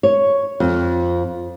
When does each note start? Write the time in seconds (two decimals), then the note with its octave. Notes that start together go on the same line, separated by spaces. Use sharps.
0.03 C#5
0.60 F2